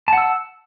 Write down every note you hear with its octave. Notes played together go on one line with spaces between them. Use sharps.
F#5 A5 E6